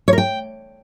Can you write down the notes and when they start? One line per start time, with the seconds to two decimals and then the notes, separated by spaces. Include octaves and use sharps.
0.08 C#5
0.13 A#4
0.18 G5